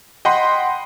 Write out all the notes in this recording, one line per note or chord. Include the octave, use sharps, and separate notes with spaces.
D#5 F#5 G5 B5 C6